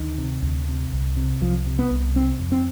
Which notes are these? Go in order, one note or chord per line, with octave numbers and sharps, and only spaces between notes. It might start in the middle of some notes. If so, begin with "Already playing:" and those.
Already playing: D2 D#3
C3
D2
C3
C2
C3
C2 F3
C3
B3
C2
C3 C4
F2
C4